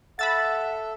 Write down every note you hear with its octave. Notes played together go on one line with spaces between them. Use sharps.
A4 E5 F#5 B5 E6 A6